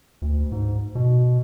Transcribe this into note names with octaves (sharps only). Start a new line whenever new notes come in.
D2
G#2
B2